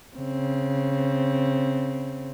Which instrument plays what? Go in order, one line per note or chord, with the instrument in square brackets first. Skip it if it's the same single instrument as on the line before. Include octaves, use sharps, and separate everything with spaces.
[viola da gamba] C#3 C4